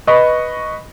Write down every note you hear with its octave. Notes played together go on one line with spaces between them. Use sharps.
B4 D#5 B5 C#6